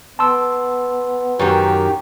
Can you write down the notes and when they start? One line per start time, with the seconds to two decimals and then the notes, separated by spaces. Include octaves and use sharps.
0.19 B3 A5 C6 E6
1.39 F#2 D#3 G4